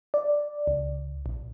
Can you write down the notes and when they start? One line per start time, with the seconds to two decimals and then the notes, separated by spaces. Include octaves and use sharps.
0.14 D5
0.67 C#2
1.26 A#1